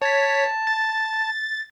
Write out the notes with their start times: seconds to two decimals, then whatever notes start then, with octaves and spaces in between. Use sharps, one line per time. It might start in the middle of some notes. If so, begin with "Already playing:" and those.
0.02 C#5 A5 B6
0.67 A6